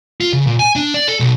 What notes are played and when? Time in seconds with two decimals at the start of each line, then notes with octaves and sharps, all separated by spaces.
0.21 F4
0.33 C#3
0.47 A#2
0.59 G#5
0.76 D4
0.94 D5
1.08 A4
1.20 B1